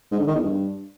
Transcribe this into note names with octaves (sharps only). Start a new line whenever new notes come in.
G#2
D3
D#3
E2
G2